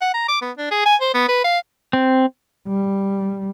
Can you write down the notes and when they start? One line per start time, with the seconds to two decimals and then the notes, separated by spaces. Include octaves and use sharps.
0.01 F#5
0.14 A#5
0.28 D6
0.42 B3
0.58 D4
0.71 G#4
0.86 G#5
1.01 C5
1.14 B3
1.29 B4
1.44 F5
1.93 C4
2.68 G3